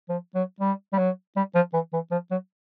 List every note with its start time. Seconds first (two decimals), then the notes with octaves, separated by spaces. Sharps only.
0.09 F3
0.35 F#3
0.60 G3
0.93 G3
0.98 F#3
1.36 G3
1.55 F3
1.73 E3
1.93 E3
2.11 F3
2.31 F#3